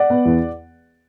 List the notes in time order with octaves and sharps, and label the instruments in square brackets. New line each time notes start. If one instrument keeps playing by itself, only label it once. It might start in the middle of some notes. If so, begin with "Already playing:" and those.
Already playing: [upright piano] D5 F#5
B3
E2